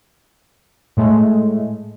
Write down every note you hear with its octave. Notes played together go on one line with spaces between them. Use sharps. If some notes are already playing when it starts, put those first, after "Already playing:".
A2 G#3 A3